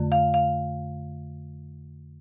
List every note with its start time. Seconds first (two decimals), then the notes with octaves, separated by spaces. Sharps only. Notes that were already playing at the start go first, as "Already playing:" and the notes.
Already playing: F2 D3 A3
0.12 F5
0.34 F5